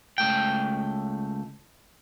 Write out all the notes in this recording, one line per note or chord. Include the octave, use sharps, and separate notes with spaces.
C#2 A3 G5